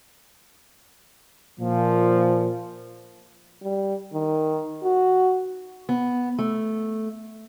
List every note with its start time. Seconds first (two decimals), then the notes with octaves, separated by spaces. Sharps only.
1.60 A#2 F3
3.62 G3
4.13 D#3
4.82 F#4
5.89 B3
6.39 A3